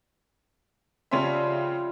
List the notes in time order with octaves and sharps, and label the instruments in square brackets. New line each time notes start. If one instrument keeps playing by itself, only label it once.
[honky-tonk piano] C#3 C#4 E5 [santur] F3 G3 C6